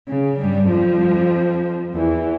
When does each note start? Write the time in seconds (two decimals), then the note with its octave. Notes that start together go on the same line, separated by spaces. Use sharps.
0.09 C#3
0.41 G2 G3
0.71 F2 F3
1.95 E2 E3